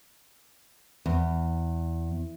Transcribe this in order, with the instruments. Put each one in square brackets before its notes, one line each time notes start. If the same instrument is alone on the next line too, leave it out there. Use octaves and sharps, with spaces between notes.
[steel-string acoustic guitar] E2